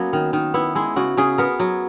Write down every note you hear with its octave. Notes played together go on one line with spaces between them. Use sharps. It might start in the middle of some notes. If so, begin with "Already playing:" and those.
Already playing: F#3 A#3 B3 C#4
D#3
D#3
B3 E4
G#3 E4
C#3 F#4
C#3 G#4
B3 A#4
F#3